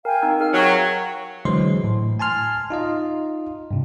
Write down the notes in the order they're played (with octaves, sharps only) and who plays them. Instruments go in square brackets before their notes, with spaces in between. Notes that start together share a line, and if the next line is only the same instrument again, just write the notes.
[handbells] A#4 [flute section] F5 G5 G#5
[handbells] C4 D#4 E6
[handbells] G#4 A#4 F5 [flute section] F6
[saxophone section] F#3 [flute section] G5 C#6
[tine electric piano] D3 E3 F#3 G#3 C5 C6
A2
G#5 A5 C6 F6
D#4 F4 D#5
G2 C3